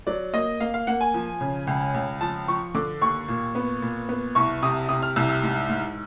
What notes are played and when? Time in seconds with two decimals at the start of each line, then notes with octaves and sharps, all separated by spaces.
0.07 F#3 D5
0.33 A#3 D#5
0.60 A#3 F5
0.74 F5
0.87 A#3 F#5
1.01 G#5
1.14 F3
1.41 C#3
1.67 C#2
1.94 C#2
2.21 F3 A5
2.48 F3 C#6
2.75 D3 D6
3.02 D#2 C#6
3.28 A#2
3.55 B3
3.82 A#2
4.09 B3
4.35 C2 C#6
4.62 C3 D#6
4.89 C3 D#6
5.02 F6
5.16 C2 E6
5.29 E6
5.43 G#2
5.69 G#2